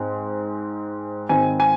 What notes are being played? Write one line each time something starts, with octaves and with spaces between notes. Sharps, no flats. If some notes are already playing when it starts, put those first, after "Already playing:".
Already playing: G#2 G#3 C4
G#1 G#2 D#3 C4 D#4 G#5
G#5